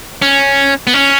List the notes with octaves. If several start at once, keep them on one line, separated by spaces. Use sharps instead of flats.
C#4
B3
C#4